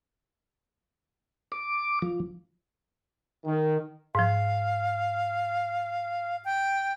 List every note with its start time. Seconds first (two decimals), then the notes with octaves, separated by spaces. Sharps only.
1.52 D6
2.02 F3
3.45 D#3
4.15 G#2 F3 F5
6.44 G5